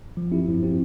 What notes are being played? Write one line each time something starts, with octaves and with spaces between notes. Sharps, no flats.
F3
C4 E4 G4
F3
C4 E4 G4